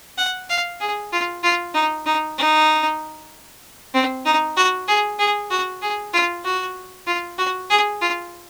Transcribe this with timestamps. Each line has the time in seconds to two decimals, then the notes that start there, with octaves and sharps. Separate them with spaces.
0.18 F#5
0.49 F5
0.81 G#4
1.13 F4
1.43 F4
1.74 D#4
2.06 D#4
2.38 D#4
3.95 C4
4.25 D#4
4.57 F#4
4.88 G#4
5.19 G#4
5.51 F#4
5.82 G#4
6.13 F4
6.45 F#4
7.07 F4
7.38 F#4
7.70 G#4
8.01 F4